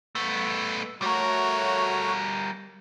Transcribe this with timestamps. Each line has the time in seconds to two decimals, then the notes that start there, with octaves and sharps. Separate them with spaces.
0.15 A3 B3
1.02 G3 A3 F#4 A#4 C#5